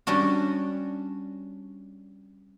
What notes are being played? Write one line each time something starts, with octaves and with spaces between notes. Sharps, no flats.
G3 C#4 D4 F#4